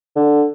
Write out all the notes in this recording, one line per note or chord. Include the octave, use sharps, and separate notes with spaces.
D3